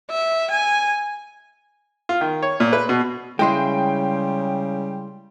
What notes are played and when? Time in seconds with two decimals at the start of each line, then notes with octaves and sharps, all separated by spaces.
0.10 E5
0.51 G#5
2.09 F4
2.21 D#3
2.43 C#5
2.60 A#2
2.73 B4
2.89 B2
3.39 C#3 G3 G#3 E4 G#4 G5 C6